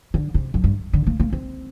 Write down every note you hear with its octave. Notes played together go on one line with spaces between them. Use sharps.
D3
C3
F#2
G2
D3
A#3
A#3
C4